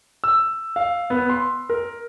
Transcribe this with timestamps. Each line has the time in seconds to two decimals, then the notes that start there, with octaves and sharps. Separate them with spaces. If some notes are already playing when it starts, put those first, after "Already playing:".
0.24 E6
0.76 F5
1.10 B3
1.29 C6
1.70 A#4